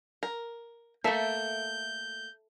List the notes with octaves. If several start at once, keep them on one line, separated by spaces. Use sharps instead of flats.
A#4
A3 A#3 A4 E5 G6